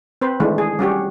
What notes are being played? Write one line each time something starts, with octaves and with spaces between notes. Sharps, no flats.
C4 B4 C5
D#3 E3 G#3 A3 D4
G#4
G3 C#4 F#4 G4